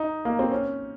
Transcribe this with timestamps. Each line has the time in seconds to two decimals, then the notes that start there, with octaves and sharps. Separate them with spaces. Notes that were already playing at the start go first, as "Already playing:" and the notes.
Already playing: D#4
0.25 A#3
0.39 C4
0.51 C#4